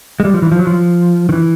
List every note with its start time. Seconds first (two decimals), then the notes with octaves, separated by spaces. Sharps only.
0.20 G#3
0.25 G3
0.34 F3
0.42 E3
0.52 F3
0.59 F#3
0.67 F3
1.29 D#3
1.32 E3